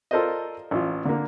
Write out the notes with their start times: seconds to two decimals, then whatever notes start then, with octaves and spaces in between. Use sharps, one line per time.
0.11 F4 A4 A#4 C5 D5 D#5
0.71 A1 F4
1.05 D3 A#3